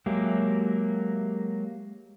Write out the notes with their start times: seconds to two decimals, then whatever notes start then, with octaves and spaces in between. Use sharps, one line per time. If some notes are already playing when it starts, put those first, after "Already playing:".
0.06 F#3 G#3 A#3 G4 E5